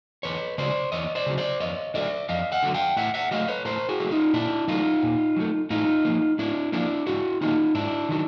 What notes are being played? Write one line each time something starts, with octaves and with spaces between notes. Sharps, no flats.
E2 B4 C#5
C#3 F#3 C5 D5
E2 C#5 D#5
C5 D5
C#3 F#3
C5 D5
F2 C#5 D#5
D3 F#3 A3 D5 E5
F2 D#5 F5
E5 F#5
D3 F#3 A3
F5 G5
A2 E5 F#5
E5 F#5
F#3 A3 D#5 F5
B4 C#5
A2 A#4 C5
F#4 G#4
F#3 A3
D#4 F4
A#2 D4 E4
F#3 A3 D#4 F4
A#2
F#3 A3
A2 D#4 F4
F3 A#3
A2 D4 E4
F3 A#3 D4 E4
G#2 E4 F#4
D#3 F#3 A#3 D#4 F4
G#2 D4 E4
D#3 F#3